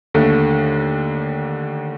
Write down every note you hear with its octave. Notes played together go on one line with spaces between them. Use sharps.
D#2 D3 A3